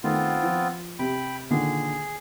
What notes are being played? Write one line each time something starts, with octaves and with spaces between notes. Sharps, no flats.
D#3 A3 B3 C4 F4
F3
C3 G5 B5
A#2 D3 D#3 G#4